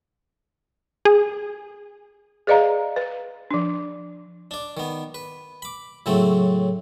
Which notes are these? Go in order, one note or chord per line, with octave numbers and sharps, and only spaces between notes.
G#4
G#4 B4 D5 D#5 F5 A#5
B4
F3 D4
D4 D5
D#3 B3
B4
B5 D6
A2 C#3 F#3 A3 C4